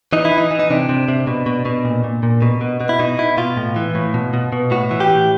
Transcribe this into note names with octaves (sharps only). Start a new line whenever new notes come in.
E3 D#4
E4
E3
D#4
E3
D#4
C3 D4
C3
C3
B2
B2
B2
A#2
A#2
A#2
B2
B2
B2
E4
B2 D#4
B2 E4
B2 F4
A2
E3
A2
B2
B2
B2
A2 F#4
E3
G4
A2